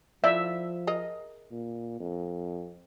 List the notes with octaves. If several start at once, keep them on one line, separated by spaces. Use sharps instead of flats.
F3 E4 F4 D5 E5
G#4 A#4 D#5
A#2
F2